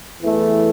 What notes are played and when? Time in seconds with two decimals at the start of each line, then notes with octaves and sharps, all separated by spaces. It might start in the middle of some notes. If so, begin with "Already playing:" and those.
0.22 E2 E3 A3